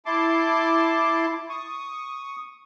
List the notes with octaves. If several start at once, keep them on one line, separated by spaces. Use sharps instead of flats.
E4 A5 C6 D6
C#6 D#6